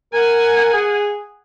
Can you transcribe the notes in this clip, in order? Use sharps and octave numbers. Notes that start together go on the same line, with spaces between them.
A#4 F#5 G#5
G#4